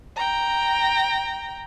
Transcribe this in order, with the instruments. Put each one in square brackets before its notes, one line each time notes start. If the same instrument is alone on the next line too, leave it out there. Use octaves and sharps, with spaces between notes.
[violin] G5 A#5